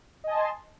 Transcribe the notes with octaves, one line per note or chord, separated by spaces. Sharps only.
D#5 G#5 A5 C6